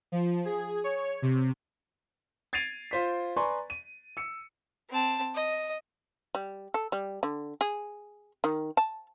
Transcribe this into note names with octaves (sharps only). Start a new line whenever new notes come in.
F3
G#4
C#5
C3
G#6 A6 C7 D7 D#7 F7
F4 C5 B6
B4 D5 G#5 A#5 C6 C#6
D#7
E6 C#7
C4 A5
D#5
G3
A4
G3
D3
G#4
D#3
A5